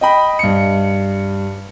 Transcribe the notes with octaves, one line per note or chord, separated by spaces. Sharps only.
D#5 G5 B5
G2 C#7